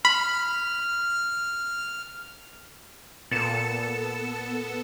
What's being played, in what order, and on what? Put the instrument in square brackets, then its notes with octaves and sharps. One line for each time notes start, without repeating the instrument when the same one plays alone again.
[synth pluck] B5 [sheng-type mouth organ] F6
[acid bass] A#2 [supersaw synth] B3 A4 [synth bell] A6 C#7 E7